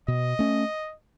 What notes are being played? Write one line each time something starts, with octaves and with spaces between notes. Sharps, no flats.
B2 D#5
A3 C#4